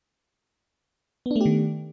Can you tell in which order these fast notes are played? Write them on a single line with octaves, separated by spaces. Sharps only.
B3 D4 A3 G4 D#3